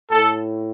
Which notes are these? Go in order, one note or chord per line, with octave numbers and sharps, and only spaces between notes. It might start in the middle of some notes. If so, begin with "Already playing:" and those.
A2 A4